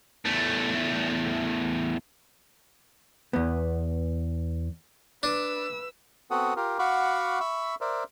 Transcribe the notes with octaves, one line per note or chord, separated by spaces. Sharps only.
E2 A3
E2 B3
D4 B4 E6
B3 C4 F#4 A4 F#5 D#6
F4 G4 A#4
F#4 F5 F#5 B5 C#6 D6
E5 B5 C#6 E6
A#4 C5 D5 E5